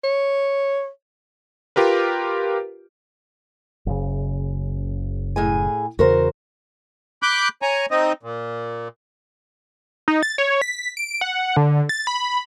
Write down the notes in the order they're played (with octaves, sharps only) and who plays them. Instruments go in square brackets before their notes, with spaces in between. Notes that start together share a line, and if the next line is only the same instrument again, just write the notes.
[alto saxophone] C#5
[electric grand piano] F4 G4 A#4 B4
[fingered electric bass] F#1 C#3
[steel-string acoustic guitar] A2 G#4 G#5
[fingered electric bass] E2 C#3 [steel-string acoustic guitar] F#4 A#4 C5
[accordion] B5 D6 F#6 G6
C#5 G#5 A#5
C4 D#4 D#5
A#2
[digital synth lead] D#4
A6
C#5
B6
D7
F#5
D3
A6
B5